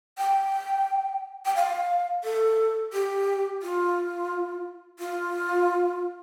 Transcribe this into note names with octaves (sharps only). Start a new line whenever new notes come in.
G5
G5
F5
A4
G4
F4
F4